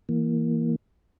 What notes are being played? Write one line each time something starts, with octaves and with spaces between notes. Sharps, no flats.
E3 A#3